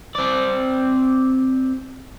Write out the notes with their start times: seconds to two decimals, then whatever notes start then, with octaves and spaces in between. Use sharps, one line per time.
0.15 C4 D5